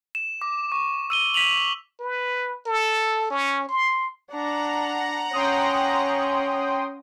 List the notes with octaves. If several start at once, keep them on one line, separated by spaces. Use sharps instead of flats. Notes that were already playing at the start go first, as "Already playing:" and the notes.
E7
D6
C#6
E6 D#7 G7
B6 D#7 F7 F#7
B4
A4
C#4
C6
D4 F#5 A#5
C#4 G5 C6 D#6